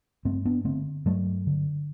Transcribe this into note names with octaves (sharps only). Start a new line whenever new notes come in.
G2 A3 C4
B3 D4
D3 A3 C4
G2 F#3 A3
D3